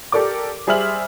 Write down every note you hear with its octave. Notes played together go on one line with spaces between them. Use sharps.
G4 A4 A#4 D5 D6
G3 G#4 C5 E5 F6 F#7